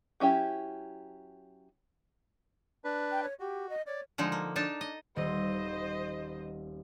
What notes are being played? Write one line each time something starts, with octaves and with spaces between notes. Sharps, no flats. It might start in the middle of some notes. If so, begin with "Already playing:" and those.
F#3 C#4 E4 G4
D4 B4
G5
C#5
F#4 G4
D#5
C#5 D5
D3 F3 G#3 D#4
A#3
D4 D#4 A5
D#5
D#1 C4 C5 D#5